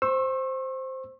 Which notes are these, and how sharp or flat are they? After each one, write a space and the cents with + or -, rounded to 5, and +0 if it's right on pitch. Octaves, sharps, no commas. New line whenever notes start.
C5 +0 C#6 -40 E6 +0